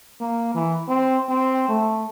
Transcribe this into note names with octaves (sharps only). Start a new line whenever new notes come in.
A#3
E3
C4
C4
A3